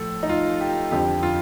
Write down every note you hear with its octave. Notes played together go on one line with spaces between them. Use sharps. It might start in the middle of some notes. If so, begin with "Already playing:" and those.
Already playing: A2 F3 A4
D#4
F4
G4
F2 D3 F3 G4
F4